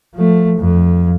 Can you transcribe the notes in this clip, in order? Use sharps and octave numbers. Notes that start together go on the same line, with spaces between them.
F3 A3
F2